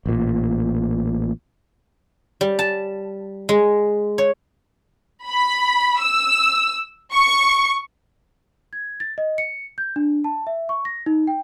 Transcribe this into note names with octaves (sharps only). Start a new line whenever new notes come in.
A1 A#2
G3
A5
G#3
C#5
B5
E6
C#6
G#6
A6
D#5
C#7
G6
D4
A5
E5
C#6
A#6
D#4
G5